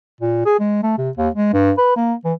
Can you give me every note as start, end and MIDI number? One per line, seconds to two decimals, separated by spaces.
0.21 0.44 46
0.45 0.56 68
0.59 0.79 56
0.83 0.97 57
0.98 1.10 48
1.17 1.29 39
1.35 1.53 56
1.53 1.72 43
1.78 1.96 71
1.96 2.14 58
2.24 2.33 52